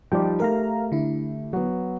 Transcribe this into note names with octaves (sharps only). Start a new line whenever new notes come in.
F3 G3 D#4 D5 G5
A3 G4 A#4 F5 A#5
D3 E4
F#3 B3